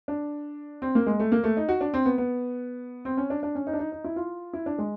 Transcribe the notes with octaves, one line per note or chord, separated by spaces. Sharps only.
D4
C4
A#3
G#3
A3
A#3
A3
D#4
F#4
D4
C4
B3
B3
C4
C#4
D4
D4
C#4
D#4
D4
D#4
D#4
E4
F4
E4
D4
G#3